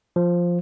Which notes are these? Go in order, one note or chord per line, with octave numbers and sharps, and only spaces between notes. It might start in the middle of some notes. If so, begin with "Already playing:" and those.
F3